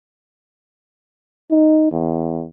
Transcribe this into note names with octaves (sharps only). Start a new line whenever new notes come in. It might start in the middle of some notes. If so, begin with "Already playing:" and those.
D#4
E2